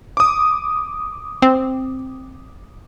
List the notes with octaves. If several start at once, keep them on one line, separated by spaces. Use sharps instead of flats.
D6 D#6
C4